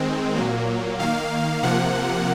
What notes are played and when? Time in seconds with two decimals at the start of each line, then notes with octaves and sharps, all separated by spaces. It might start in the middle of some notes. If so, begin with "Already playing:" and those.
Already playing: D#3 G#3 C4
0.36 A#2 F#3 A#3
0.99 D#3 A#3 F5
1.63 C3 F3 A#3 F#5